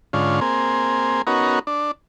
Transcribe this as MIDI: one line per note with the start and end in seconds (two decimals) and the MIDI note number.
0.13 0.40 44
0.13 0.40 50
0.13 0.40 61
0.13 0.40 65
0.41 1.22 58
0.41 1.22 60
0.41 1.22 68
1.27 1.59 59
1.27 1.59 61
1.27 1.59 63
1.27 1.59 66
1.27 1.59 70
1.67 1.91 62